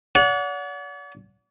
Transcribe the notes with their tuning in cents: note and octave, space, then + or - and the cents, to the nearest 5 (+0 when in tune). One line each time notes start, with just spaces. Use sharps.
D5 -45 F#5 -20